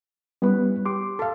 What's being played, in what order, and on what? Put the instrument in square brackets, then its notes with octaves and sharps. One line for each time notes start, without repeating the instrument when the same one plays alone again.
[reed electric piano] G3 B3 [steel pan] C#4 E4 B4
[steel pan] G4 [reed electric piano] C6 D6
[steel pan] A4 F5